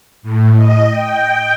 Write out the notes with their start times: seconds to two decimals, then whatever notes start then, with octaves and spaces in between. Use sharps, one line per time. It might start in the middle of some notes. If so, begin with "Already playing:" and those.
0.23 A2
0.56 D#5
0.90 G5